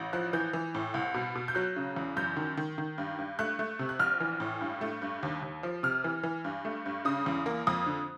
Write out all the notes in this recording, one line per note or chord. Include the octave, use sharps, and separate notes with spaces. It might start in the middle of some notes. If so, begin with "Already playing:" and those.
Already playing: A1
F3 F#6
E3 G6
E3
A2
C2
B2
B2
G6
F#3 F#6
C#3
E2
F#2 G6
D#3
D#3
D#3
G2
G2
A3 F#6
A3
C3
F#6
A#1 F6
E3
A2
G2
A3
G2
D#2
D#2
F3
C3 F6
E3
E3
G2
A3
G2
C#3 D#6
E2
A#3
F2 D#6
D3